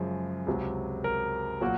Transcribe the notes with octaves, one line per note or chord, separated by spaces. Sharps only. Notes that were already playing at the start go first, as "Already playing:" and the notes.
Already playing: F#2 C#3 F3 G#3
C#2 C3 F#3
A#4
A#2 F#3 A#3 F#4